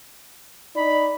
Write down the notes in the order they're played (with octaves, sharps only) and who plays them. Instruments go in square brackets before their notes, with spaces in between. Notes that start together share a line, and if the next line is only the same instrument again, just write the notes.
[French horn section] D#4 D5 [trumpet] B5